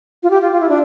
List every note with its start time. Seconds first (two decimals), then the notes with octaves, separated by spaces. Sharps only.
0.23 F4
0.30 G4
0.41 F4
0.52 F4
0.61 E4
0.69 D4